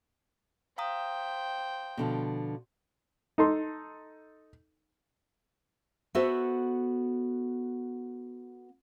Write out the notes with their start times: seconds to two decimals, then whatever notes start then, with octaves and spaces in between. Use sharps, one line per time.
0.78 C5 F5 G5 A#5 D#6
1.97 B2 D3 F3
3.38 D#4 A4 C6
6.15 B3 F#4 A4 C5 E5